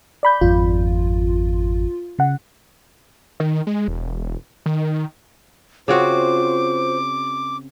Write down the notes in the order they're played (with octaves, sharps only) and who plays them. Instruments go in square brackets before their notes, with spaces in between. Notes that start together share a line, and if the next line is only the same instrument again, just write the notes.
[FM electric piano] D5 B5 G6
[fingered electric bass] G#1 F2 [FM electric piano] F4
[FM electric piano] C#3 F#5
[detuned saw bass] D#3
G#3
E1
D#3
[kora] C#3 C4 F#4 [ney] F4 [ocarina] C5 [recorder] D6